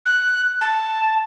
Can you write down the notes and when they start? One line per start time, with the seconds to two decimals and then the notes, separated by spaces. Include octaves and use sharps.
0.06 F#6
0.61 A5